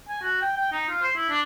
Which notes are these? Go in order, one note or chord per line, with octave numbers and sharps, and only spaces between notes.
G#5
F#4
G5
G5
D#4
F4
C5
E4
D4